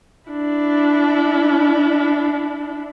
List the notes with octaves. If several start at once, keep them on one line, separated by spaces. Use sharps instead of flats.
D4 E4